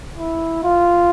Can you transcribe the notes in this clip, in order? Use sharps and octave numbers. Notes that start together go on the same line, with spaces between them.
E4
F4